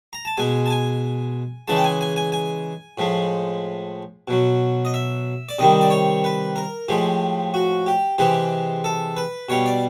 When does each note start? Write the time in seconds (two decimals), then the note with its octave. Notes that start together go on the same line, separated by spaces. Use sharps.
0.13 A#5
0.25 A5
0.37 B2 G#3 G#5
0.66 A5
0.70 G#5
1.68 C#3 E3 G#3 A5
1.76 G5
1.84 G#5
2.01 G#5
2.16 G#5
2.32 G#5
2.98 A2 F3 G#3
4.28 B2 F#3
4.85 D#5
4.94 E5
5.49 D5
5.59 C3 D#3 G3 D#5
5.81 D5
5.90 C#5
6.24 B4
6.56 A#4
6.88 A2 F3 G#3 G4
7.54 F#4
7.86 G4
8.18 C3 E3 G#3 G4
8.84 A4
9.17 B4
9.49 B2 G3 C#5
9.66 D5